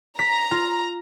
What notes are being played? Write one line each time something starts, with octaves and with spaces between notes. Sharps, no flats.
A#5 B6
F4